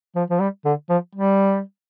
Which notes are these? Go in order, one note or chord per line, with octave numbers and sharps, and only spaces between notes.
F3
F3
G3
D3
F3
G3